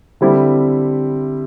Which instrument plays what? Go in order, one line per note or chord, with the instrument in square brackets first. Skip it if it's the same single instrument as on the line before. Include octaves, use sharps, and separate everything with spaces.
[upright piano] D3 G3 C4 E4